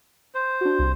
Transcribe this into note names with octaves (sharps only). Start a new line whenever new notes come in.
C5
D4 F#4
C2